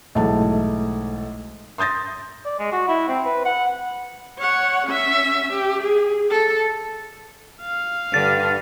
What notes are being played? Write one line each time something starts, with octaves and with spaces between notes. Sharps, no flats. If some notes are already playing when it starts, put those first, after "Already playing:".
B1 G#2 E3 A3 A5
C6 D#6 G6 A6 A#6
D5
G#3
F#4
E4
C4
B4
F#5
C#5 F#5
C#4 E5
G4
G#4
A4
F5
G2 D3 A6